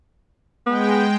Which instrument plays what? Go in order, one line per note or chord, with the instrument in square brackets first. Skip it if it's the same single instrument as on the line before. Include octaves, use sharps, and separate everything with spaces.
[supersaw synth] G#3 G5 [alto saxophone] B3